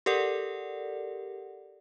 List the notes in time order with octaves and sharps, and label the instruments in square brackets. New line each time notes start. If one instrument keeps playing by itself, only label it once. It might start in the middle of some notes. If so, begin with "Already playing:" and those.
[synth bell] G4 A4 A#4 D5 F#5